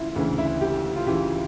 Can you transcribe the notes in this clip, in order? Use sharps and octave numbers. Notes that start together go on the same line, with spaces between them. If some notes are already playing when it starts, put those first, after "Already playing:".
Already playing: D2 C#3 E3 E4 F4
D2 C#3 E3
E4
G4
F4
D2 C#3 E3 G4